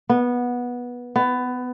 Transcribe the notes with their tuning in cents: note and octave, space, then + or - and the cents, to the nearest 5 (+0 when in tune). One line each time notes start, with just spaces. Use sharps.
B3 -15
B3 +20